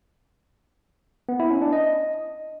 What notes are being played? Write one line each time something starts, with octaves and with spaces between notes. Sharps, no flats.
B3
E4
C#4
D4
D#5